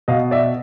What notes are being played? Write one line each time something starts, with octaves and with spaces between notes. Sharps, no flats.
B2 D#5 F5
D5 E5